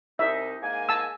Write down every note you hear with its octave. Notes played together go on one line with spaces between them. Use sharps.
C2 D#4 E5
G#2 A#3 G#5
A5 E6